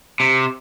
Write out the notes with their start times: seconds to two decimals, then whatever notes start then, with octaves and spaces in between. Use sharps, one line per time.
0.20 C3